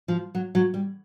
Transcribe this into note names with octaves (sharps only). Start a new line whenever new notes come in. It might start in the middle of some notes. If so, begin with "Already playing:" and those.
F3
F#3
F#3
G3